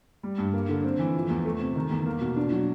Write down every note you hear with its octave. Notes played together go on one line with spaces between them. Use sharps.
G3
G2
A#3
D3
C4
E3
F3
E2
A3
C3
D#3
E2
A#3
B2
D4
F#3